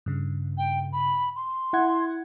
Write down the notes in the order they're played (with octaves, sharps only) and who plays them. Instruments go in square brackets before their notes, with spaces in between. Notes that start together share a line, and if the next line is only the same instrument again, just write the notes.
[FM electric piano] G2 C#3
[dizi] G5
B5
C6
[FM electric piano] E4 F#5 G#6